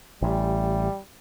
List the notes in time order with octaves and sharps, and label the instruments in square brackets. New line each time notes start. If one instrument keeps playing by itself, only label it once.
[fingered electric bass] A1 [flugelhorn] G3